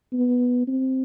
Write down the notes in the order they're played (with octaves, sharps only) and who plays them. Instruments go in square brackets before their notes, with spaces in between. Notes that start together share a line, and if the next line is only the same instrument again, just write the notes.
[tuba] B3
C4